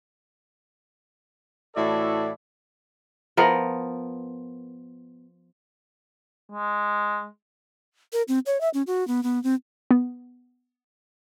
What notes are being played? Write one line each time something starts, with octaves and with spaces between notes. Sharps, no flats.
A2 E3 E4 F#4 A4 D5
F3 B3 A#4
G#3
A#4
C4
C#5
E5
C#4
F#4
B3
B3
C4
B3